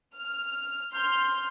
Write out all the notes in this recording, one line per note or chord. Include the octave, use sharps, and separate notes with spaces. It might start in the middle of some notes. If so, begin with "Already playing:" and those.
F6
C6 F6 G6